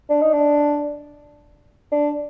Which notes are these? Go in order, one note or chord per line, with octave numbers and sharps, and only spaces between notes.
D4
D#4
D4
D4